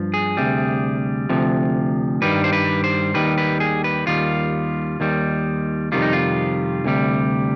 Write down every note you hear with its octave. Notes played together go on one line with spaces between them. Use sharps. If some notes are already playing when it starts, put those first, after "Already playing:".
Already playing: G2 F3
G#4
D2 C3 G3
D2 C3 F3
G2 D#3 G3 B4
C5
B4
C5
D#2 D#3 G3 B4
B4
G#4
B4
D#2 D#3 G3 F4
D#2 D#3 G3
F2 C3 D#3 G3 F4
D#4
F4
D2 C3 G3